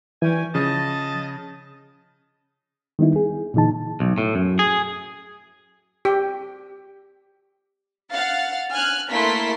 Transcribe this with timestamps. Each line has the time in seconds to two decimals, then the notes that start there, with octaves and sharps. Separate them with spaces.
0.22 E3 G3 C#4 G#5
0.55 C#3 F3 D#5 A5
2.99 D#3 G3 B3 D#4 E4
3.16 G#4
3.54 A#2 D3 E3 D#4 A5
4.00 B1
4.18 A2
4.35 F#2
4.59 G#4
6.05 G4
8.12 F5 F#5 A6
8.73 G#5 F6 F#6
9.11 A3 A#3 E4 C6 B6